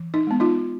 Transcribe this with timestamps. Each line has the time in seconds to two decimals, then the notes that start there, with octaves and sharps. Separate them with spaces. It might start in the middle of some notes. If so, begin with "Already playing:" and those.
Already playing: E3
0.14 D#4
0.27 G#3 B3
0.40 D#4 F4